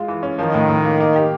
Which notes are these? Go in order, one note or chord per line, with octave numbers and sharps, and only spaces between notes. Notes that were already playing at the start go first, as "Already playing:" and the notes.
Already playing: G#3 F4
E3
C#4
D#3 F3
A2
A2
A#3
A#3
G4